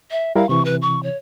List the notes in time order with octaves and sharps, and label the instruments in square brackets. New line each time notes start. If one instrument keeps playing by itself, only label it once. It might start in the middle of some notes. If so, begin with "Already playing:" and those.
[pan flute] E5
[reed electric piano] G3 E4 A#4 [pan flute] F5
[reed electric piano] C3 E3 [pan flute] C#6
[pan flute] B4
C#6
C#5